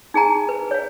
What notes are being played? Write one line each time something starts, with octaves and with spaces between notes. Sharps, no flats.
D#4 G#4 G#5 A#5
B4
C#5 F5